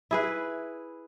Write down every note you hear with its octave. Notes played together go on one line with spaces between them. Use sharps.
E4 G#4 B4